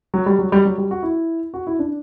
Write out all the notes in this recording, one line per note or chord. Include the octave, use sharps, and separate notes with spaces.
F#3
G3
F#3
G3
F#3
G3
F#4
E4
F#4
E4
D4